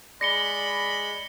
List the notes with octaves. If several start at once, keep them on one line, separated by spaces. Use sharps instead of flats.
G#3 D5 B5 A#6 C#7 G7